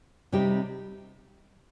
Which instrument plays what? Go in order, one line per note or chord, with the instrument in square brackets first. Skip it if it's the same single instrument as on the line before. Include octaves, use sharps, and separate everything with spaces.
[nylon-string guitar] C3 G3 C4 D#4 G4